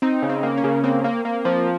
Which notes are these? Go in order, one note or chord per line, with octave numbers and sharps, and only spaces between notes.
C4 D#4
C#3
C4
A#3
C#4
C#3
A#3 C4
A#3
A#3
F3